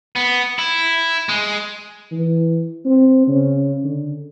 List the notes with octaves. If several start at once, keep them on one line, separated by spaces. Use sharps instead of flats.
B3
E4
G#3
E3
C4
C#3
D3